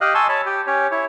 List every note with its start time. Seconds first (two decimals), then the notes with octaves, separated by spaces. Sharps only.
0.01 G4 D#5 F5 F#6
0.14 G#5 A5 C6 C#6 E6
0.29 C#5 A5 B5
0.46 G4
0.67 C#4 G4 C#5
0.91 E4 C#5